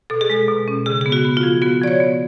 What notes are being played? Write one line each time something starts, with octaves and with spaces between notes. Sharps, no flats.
B2 A4
G#4
G#3 A4
B2
C#4
C#3 G#4
B3 G#4
F#4
B3
F4
F3
B3 F#4
F3 D5
C#5
B3